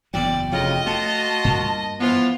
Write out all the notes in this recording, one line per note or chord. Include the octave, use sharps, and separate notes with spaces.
F#1 E2 F#3 D5 G5
F1 D2 C#3 F4 D#5
A3 F4 F#4 A5
G2 A#3
E3 F3 B3 F4